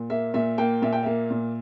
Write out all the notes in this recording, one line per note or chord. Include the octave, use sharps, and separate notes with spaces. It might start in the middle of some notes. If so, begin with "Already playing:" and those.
Already playing: A#2
A#3 E5
A#2 E5
A#3 G5
A#2 E5
G5
A#3 E5
A#2